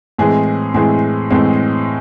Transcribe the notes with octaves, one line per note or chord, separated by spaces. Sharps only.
A2 E3 G#3 C4 G#4
A2 E3 G#3 C4 G#4
A2 E3 G#3 C4